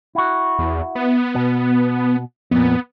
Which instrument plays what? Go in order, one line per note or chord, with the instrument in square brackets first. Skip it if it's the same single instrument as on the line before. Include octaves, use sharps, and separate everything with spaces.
[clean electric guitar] E4 F#4
[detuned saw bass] E2
B3
[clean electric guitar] B2
[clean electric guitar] F2 A#2 [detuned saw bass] B3